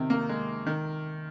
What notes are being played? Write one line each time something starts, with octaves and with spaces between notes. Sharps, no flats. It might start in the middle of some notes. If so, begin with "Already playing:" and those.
Already playing: C3 D#3
A#3
G#3
D#3